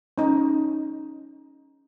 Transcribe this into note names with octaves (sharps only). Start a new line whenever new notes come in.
C#4 D#4